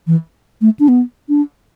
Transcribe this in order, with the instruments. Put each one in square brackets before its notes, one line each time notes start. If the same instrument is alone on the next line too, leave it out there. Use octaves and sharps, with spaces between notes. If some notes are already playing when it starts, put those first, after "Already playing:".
[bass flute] E3
A3
D4
B3
D4